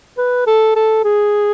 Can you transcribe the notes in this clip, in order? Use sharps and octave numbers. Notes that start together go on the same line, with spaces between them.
B4
A4
A4
G#4